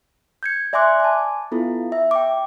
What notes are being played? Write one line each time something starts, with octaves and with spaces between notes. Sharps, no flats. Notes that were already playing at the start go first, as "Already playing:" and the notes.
G6 G#6 C#7
D5 E5 G#5 C6 D6 F#6
G#5 A5
B3 E4 F4 A4
E5
G5 D6